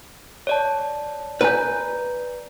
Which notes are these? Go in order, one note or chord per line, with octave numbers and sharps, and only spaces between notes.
C#5 D5 A5
B4 D5 G#5 A#5 G6